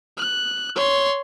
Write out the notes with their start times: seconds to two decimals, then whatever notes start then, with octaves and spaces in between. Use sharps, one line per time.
0.17 F#6
0.76 C#5 C6